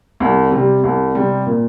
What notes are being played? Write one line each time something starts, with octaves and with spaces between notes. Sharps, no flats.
C2
C3 G3
C2
C3 G3
A#2